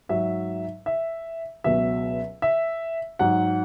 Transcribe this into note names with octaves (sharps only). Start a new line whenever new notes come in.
G#2 F#3 E5
E5
C#2 B2 F#3 E5
E5
G#2 F#3 F#5